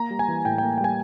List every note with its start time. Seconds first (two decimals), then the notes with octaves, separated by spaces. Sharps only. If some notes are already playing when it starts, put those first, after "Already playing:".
Already playing: A#3 A#5
0.11 G3
0.19 G#5
0.28 E3
0.45 A2 G5
0.58 G5
0.63 A#3
0.78 G5
0.81 G3 G#5